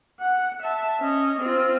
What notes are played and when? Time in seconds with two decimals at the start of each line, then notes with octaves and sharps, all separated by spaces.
0.20 F#5
0.63 E5 A5
1.00 C#4 D#5
1.41 C4 F4